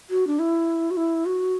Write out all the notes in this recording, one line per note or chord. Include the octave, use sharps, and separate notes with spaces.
F#4
D4
E4
F#4
E4
F#4